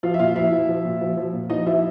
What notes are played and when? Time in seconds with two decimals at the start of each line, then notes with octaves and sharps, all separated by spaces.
0.03 F3 F4 F5
0.14 E5
0.19 A#2 F4 F5
0.36 F3 E4 E5
0.52 F3
0.69 F3
0.85 A#2
1.02 F3
1.17 F3
1.34 A#2
1.50 F3 D#4 D#5
1.66 F3 E4 E5